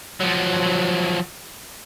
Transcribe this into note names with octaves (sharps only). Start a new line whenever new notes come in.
F3 F#3